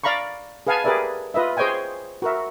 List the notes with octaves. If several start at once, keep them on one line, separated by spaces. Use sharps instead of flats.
D5 F5 A#5 B5 C#6
G#4 B4 F5 F#5 G#5 A5
G4 G#4 A#4 B4 D5 E5
F4 B4 D#5 E5
G#4 C5 C#5 D#5 G5 G#5
F#4 A#4 E5